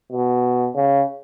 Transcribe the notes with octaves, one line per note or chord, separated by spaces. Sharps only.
B2
C#3